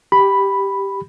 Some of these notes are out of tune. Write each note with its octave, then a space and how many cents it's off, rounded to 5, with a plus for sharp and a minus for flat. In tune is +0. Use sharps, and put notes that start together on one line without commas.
G4 +0 B5 +0